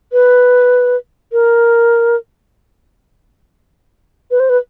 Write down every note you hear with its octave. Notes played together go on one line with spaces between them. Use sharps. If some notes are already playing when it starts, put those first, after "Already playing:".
B4
A#4
B4
C5
B4